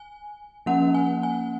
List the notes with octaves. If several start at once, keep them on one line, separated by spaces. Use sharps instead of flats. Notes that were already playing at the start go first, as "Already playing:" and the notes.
Already playing: G#5
F3 A#3 C#4 F#5
G#5
G#5